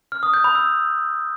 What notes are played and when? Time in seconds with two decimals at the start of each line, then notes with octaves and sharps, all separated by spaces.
0.12 F6
0.23 D#6
0.34 G6
0.44 B5
0.55 E6